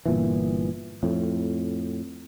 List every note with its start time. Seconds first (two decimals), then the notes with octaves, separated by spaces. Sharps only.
0.06 G1 A#2 E3
1.03 F2 A2